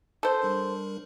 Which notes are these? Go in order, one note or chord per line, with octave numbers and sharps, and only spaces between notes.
A4 C5
G3 D4 A#4